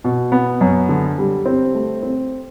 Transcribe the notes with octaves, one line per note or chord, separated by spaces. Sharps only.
B2
B3
F#2
D3
G3
C4
A3
C4